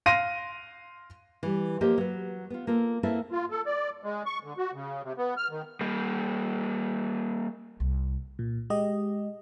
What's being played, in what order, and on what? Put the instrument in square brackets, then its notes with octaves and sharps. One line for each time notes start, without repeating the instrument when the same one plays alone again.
[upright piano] F5 C6 A#6 D#7
[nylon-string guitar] E3 G3
F3 A#3 G4 C5 D#5
F#3 B4
B3 F4
A#3 F4 A4
A3 A#3 C4 E4 A4 B4
[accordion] F4
A4
D5
G#3
C#6
D3
F#4
C#3
C3
B3
F6
D#3
[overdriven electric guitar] G3 A#3
[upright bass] C2
[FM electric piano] A#2
G#3 G4 D#5